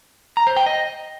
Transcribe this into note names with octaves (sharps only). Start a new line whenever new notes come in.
A#5
C5
G5
D#5